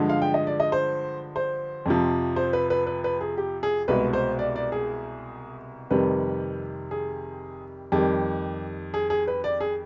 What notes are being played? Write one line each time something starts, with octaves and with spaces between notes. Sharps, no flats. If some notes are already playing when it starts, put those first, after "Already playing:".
Already playing: G2 D3 F3 G#3
F5
G5
D#5
D5
D#5
C5
C5
F2 C3 F3
C5
B4
B4
B4
B4
G#4
G4
G#4
C2 B2 G#3 B4
C5
D5
D5
G#4
F2 C3 D#3 G3 B4
G#4
F2 D#3 G3 G4
G#4
G#4
B4
D5
G#4